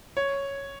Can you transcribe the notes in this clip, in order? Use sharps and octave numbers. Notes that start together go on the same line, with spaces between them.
C#5